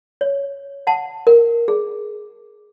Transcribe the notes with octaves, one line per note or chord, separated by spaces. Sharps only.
C#5
F#5 A5
A#4
G#4